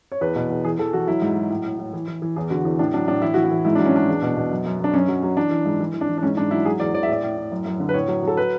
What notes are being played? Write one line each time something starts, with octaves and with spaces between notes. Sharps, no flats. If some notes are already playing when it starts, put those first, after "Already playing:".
C#5
E2 B4
B2
E2
E3 G#4
E3 A4
E3 F#4
F#3 E4
G#2
F#3
A2
A2
A2
E3
E3
E3
E2 G#4
D3 F#4
E2
A2 D4
F#3 D4
A2 D4
E3 E4
E3 F#4
E4
E3
G#2 E4
F#3 D4
C#4
F#3 D4
E2
B2
B2
F#2
F#2
F#2 D4
F#2 C#4
F#3
F#3
E3 D4
E3
G#2
E3
E3
D4
E3
D4
G#2 C#4
G#2 D4
F#3 E4
F#3 G#4
E2 D5
E2 D5
E5
A2 D5
A2
A2
F#2
F#2
D3
B4
A2 C#5
F#3
F#3 A4
B4